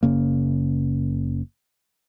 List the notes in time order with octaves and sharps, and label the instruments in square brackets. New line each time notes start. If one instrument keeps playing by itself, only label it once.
[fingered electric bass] F#1 C#3 A#3